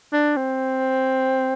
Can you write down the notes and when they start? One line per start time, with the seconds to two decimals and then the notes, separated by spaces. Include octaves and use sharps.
0.13 D4
0.37 C4